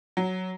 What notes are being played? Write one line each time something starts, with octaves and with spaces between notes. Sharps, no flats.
F#3